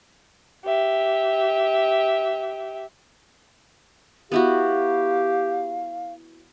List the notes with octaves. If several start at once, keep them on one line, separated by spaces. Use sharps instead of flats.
G4 E5
B3 E4 F#4 G4 F5